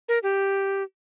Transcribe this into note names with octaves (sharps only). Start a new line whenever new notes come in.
A#4
G4